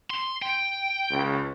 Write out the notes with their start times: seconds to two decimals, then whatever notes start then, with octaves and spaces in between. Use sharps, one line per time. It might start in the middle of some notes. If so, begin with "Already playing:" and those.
0.10 C6
0.42 G5
1.11 C#2